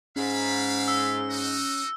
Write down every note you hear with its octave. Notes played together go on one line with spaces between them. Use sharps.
G#2 C#4 E5 F5 B5
E6
D#4 F#4